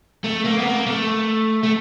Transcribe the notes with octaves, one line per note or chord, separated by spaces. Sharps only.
A3
A#3
B3
A#3
A3
A3